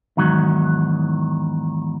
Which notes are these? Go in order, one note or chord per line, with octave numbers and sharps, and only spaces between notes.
E2 G#2 D#3 F#3